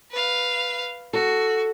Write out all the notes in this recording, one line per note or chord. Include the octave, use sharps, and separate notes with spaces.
B4 F5
F#4 A4